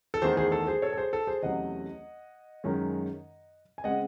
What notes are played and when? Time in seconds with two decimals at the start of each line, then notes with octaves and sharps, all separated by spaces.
0.14 A4
0.22 E2 D#3 A3 G#4 C5
0.37 G#4 C5
0.52 A4
0.67 G#4 C5
0.82 A4 C#5
0.93 A4
0.97 G#4 C5
1.13 A4
1.27 G#4 C5
1.43 E2 C3 F#3 A3 C#4 D#5 F#5
2.64 F#2 D#3 G#3 C#4
3.78 G#5
3.84 C#3 G#3 C4 D#5 F#5